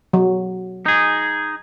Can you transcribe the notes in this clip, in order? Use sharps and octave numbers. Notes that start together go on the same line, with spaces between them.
F#3
D#4 G#4